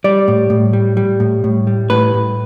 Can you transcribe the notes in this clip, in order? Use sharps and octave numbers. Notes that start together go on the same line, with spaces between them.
G3 D5
A2
A2
G3
G3
A2
A2
G3
A2 B4
A2